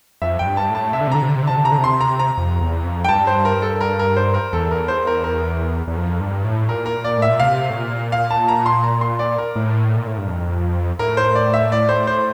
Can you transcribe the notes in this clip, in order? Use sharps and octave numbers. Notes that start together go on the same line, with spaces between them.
F2 E5
F2 G5
G2
A5
A2
A5
C3 E5
D3
C3
D3 A#5
C3
D3
C3
D3
C3 A5
D3
C3 A#5
D3
C3
C6
A#5
A#5
F2
E2
F2
G5
G2 A5
C5
A#4
A4
A#4
A#4
C5
A#4
E2 A4
A#4
C5
A#4
A#4
E2
F2
G2
A2
A#2 A#4
A#4
D5
A2 E5
A#2
C3 F5
A2
A#2
F5
A5
A#5
C6
A#5
C6
D5
A#4
A2
A#2
A2
G2
F2
A2 A#4
C5
D5
E5
D5
C5
C5